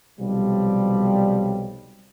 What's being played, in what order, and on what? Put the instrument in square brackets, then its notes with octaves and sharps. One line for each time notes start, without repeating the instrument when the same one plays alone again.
[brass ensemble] B1 C3 F3 G3